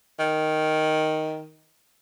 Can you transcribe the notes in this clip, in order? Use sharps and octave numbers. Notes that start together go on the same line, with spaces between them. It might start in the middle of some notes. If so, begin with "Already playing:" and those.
D#3